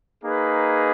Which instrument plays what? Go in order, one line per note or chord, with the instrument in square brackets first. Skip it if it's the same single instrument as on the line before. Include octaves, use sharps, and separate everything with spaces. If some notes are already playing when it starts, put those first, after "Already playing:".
[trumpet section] A#3 D#4 G#4 B4